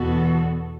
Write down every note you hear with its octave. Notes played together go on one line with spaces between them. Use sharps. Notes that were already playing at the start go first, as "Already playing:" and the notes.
Already playing: E2 B2 B3 F#4 A4